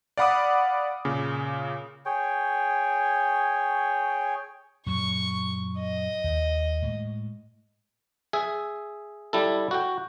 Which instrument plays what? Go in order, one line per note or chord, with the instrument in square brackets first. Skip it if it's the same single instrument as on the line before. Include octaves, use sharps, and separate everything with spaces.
[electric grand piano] D5 F5 F#5 B5 D6 D#6
A#2 C#3
[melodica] G#4 C#5 G5
[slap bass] F#2 A#2 F#3 [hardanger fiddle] C#6
[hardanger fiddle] D#5
[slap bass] D#2
A2 G#3
[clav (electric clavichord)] G#4 E5
G3 E4 A4
F#4 G5